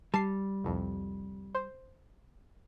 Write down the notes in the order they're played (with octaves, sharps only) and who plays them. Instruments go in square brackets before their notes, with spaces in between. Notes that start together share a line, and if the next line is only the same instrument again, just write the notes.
[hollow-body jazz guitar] G3 [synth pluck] A5 C7
[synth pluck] C2 F2
C5